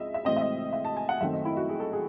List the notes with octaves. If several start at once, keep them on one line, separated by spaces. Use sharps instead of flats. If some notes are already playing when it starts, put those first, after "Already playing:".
Already playing: C#2 C#3 C4 D#5 E5
E5
A1 A2 G#3 C4 D#5
E5
D#5
E5
A5
G#5
F#5
F#2 D#3 A3 C4 E5
D#5
E4
F#4
G#4
A4
G#4